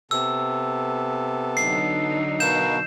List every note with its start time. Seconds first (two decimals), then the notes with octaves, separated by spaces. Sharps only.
0.11 C3 B3 A4 E6
1.57 D3 F#3 D#4 C7
2.40 B2 A#4 B4 F5 G6 E7